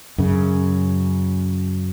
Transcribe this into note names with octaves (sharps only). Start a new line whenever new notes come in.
F#2 C#3